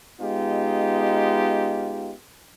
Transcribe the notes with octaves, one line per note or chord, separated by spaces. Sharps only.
G#3 B3 D#4 F4 G4